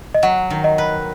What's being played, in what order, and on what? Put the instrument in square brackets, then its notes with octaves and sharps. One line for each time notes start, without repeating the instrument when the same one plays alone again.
[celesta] D#5
[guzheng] F#3 [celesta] F#5
[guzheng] D#3
[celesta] D#5
[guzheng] B4